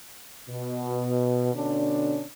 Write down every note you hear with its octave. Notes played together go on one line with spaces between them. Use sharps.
B2
B2 D3 C#4 D4